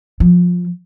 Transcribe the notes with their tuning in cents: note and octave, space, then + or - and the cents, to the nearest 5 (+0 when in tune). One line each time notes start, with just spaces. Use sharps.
F3 +20